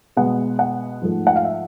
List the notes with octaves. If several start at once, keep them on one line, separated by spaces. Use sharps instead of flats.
B2 G#3 B3 F#5
F#5
G#2 F3 A3
F#5
F5
E5